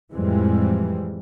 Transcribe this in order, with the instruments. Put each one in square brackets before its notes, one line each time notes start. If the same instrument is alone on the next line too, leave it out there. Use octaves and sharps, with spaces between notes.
[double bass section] F2 A2 E3 G3 G#3 C4